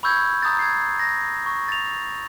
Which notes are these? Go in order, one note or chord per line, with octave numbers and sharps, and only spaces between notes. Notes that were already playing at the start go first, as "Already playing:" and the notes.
B5 C#6 E6 G6 G#6
A#5 D#6 G6 A6
G#6 C7
A#6
C#6
A6 F7